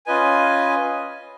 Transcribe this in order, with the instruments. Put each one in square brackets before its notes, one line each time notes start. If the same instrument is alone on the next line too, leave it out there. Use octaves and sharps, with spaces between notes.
[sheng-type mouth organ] C#4 F4 B4 D#5 G#5